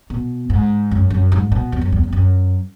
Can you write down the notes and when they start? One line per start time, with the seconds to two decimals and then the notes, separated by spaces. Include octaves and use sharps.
0.10 B2
0.50 G#2
0.91 F#2
1.10 F#2
1.32 G#2
1.52 B2
1.72 E2
1.81 F#2
1.92 E2
2.03 E2
2.13 F#2